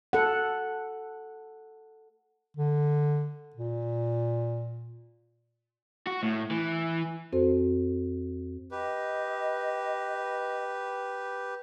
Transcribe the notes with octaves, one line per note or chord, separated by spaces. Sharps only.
A4 F#5
D3
A#2
F#4
A2
E3
F2 C4 F#4 A4 C5
G4 B4 D#5